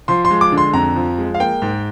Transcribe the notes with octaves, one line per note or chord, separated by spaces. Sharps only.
F3 C6
C6
G#3
D6
D3
C6
F2 A#5
F3
G#3
F5
A#3 G5
G#2